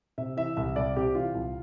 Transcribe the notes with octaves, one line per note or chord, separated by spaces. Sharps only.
C3 E5
E3 E5
C2 E5
C2 D5
C3 G4
E3 F4
C2